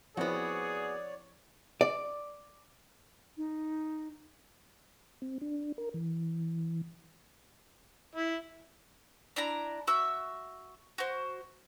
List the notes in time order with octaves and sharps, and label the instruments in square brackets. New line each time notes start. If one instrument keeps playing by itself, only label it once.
[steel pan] F3 C4 E4 [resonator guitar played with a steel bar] B3 F#4 [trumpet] G#4 [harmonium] C#5 D5
[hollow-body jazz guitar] D5
[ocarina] D#4
[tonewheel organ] C4
D4
A#4
E3
[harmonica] E4
[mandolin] D4 E4 A#5
F#4 E5 E6
F#4 C5